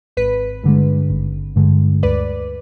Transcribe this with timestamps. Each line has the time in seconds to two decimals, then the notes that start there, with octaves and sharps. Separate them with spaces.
0.17 G#1 B4
0.63 G2 D3 G#3
1.10 G#1
1.56 G2 D3 G#3
2.03 D2 B4 D5